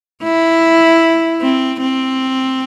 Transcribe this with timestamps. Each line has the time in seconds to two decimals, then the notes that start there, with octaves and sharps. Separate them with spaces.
0.23 E4
1.42 C4
1.81 C4